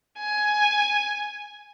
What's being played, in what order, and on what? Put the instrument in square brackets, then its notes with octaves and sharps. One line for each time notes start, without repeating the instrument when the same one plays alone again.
[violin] G#5